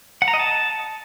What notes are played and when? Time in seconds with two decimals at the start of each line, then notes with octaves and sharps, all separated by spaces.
0.22 F#5
0.28 A#5
0.34 D#5
0.39 A5